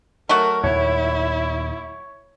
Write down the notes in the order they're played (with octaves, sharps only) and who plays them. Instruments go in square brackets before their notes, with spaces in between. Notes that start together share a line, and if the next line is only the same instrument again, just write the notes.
[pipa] F#3 A3 F#4 [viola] A#4
[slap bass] D#2 A#2 [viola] E4 [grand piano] C#5